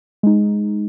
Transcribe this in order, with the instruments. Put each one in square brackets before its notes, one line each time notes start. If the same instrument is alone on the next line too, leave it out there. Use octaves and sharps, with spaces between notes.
[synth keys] G#3 D#4